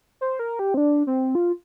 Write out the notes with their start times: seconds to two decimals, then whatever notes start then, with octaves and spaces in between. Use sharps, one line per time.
0.21 C5
0.39 A#4
0.59 G4
0.74 C4
0.77 D4
1.07 C4
1.35 F4